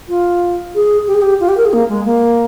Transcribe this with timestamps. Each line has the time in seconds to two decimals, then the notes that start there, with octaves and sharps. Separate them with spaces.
0.09 F4
0.75 G#4
1.07 G4
1.14 G#4
1.22 G4
1.40 F4
1.49 G4
1.57 A#4
1.65 G#4
1.73 A#3
1.89 G#3
2.06 A#3